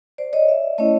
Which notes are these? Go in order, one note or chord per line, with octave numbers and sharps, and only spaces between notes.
C5 D5
C#5 D#5
D5 E5
A3 C#4 E4 C#5 D#5